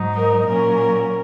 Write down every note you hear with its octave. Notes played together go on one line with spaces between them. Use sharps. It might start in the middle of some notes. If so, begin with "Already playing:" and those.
Already playing: G#2 F#3 D#4
A#4
A#2 F#3 C#4 A#4